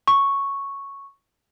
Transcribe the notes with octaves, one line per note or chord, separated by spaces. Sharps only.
C#6